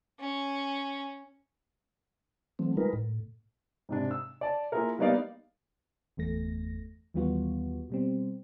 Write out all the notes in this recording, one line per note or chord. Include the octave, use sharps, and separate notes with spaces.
C#4
E3 F#3 A3 C4
G3 G#3 D#4 F4 A#4 B4
A2
G#2 C3 D4
E6
D5 A5
A#3 E4 F4 G#4 A#4
G3 A#3 B3 D#4 D5 F5
G1 E2 A3 A#6
D#2 E3 G3 B3 F4 F#4
B2 G3 C4